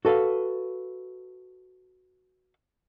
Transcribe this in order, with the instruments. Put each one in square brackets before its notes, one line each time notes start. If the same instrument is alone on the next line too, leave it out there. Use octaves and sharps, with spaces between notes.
[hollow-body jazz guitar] F#4 A4 B4 F5